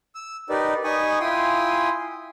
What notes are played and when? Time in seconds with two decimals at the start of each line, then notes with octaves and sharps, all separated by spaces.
0.15 E6
0.50 D#4 G4 A#4 B4 D5
0.84 D#4 G#5 B5 C#6 D#6
1.20 E4 F4 G5 G#5 C6 D#6